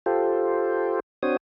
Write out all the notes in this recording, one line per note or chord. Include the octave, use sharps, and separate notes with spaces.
F4 G4 A4 C5
C4 D4 F#4 C5 C#5 D#6